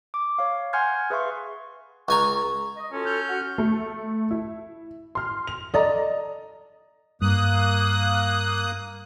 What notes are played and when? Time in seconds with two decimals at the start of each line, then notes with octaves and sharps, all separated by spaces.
0.14 D6
0.39 C#5 F5
0.73 F#5 G#5 C6 F6 G6 G#6
1.10 G#4 B4 E5 F5 C6 C#6
2.09 C#2 G#5 A#5 C#6
2.77 D#5
2.92 C#4 F4 F#4 A4
3.06 F6 G6
3.29 F#4 F#5
3.58 A3
4.31 E4
5.15 C6 F6
5.47 F7
5.74 A4 D5 D#5 A#5
7.22 G2 A#3 D#6 F#6